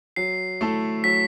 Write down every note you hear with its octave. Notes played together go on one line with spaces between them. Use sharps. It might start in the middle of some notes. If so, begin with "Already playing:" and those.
F#3 C7
A3 E4 A4
F#3 B6